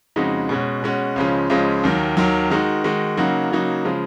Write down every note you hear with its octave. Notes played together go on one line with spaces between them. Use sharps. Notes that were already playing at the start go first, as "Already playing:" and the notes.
F2 C#3 G#3 D#4 F#4
B2 G#3 C#4 F#4
B2 G#3 C#4 F#4
C#2 C#3 F3 G#3 C#4
C#2 C#3 F3 G#3 C#4
D#2 D#3 F#3
D#2 D#3 F#3
D#3 G#3 D#4 F#4
D#3 G#3 D#4 F#4
C#3 F#3 A#3 D#4 F#4
C#3 F#3 A#3 D#4 F#4
C#3 F3 G#3